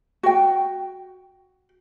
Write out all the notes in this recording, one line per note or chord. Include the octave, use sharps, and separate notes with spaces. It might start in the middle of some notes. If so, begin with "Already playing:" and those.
F#4 G5